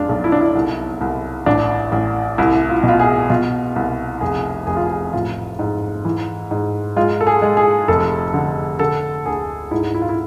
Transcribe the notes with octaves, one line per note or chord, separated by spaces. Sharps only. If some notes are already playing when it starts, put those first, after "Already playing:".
Already playing: F1 G#3 D4 F4
B1
E4
D4
E4
C2
C2
A1 D4
A1
C2 E4
F4
B2
F4
G#4
B2 F4
C2
F1 G#4
F1 G#4
F4
G#4
A1 F4
G#2
E3
G#2
G#3 F4
A4
G#4
G#3
G#4
F1 A4
D3
D3 A4
D2 G#4
G#2 E4
E4
F4
E4